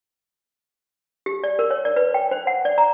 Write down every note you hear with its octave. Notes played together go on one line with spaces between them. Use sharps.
G4
D5
A#4
C#5
D5
B4
G5
C5
F#5
D5
A#5